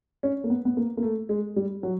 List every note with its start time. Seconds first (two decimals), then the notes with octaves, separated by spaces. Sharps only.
0.23 C#4
0.44 A#3
0.50 B3
0.65 B3
0.77 A#3
0.97 A#3
1.03 A3
1.29 G#3
1.56 G3
1.83 F#3